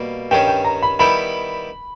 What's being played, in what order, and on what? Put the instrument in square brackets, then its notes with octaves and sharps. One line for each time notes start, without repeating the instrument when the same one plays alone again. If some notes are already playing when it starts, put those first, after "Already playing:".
Already playing: [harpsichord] B2 G3 A#3
[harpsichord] G2 D#3 G3 C#4 [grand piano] G5
[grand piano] G5
A#5
B5
[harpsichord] D#3 G3 B3 E4 G4 [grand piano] B5